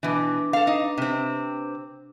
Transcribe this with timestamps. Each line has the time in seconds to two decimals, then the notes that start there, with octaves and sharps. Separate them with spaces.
0.03 B2 E3 D4 B4 D6
0.53 A4 F5
0.67 D#4
0.98 C3 C4